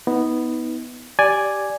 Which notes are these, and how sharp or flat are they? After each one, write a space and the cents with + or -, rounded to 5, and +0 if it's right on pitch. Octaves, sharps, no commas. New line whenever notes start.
B3 +0 D#4 +35
G4 -5 D5 +0 G#5 +0